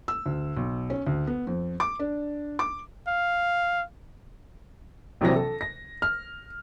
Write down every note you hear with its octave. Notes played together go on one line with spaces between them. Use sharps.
E6
D2
B1
C#4
D2
B3
F2
D6
D4
D6
F5
A#1 C3 E3 F#3 C4 A#6
A4
A#6
F6